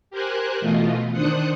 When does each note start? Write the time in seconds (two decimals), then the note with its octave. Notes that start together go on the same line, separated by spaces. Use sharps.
0.10 G4 A#4 C5 G#5 F#6
0.60 B2 E3 A3 F4 D#5
1.12 D#3 D4 C5 D#6 F#6 C#7